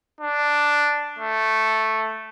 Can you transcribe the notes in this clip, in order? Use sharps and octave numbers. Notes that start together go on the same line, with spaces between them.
D4
A3